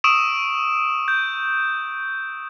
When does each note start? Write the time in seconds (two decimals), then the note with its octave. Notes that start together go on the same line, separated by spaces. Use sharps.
0.04 C#6 D#6 E6 D7 E7
1.08 G6